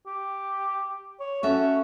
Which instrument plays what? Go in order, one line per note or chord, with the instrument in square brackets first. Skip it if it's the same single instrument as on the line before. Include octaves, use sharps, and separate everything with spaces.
[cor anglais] G4
C#5
[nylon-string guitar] C#4 A4 E5 [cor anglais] F#4